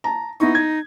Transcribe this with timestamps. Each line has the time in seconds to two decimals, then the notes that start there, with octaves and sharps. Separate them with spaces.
0.04 A5 A#5
0.40 B3 D#4 E4 C#6
0.55 G#6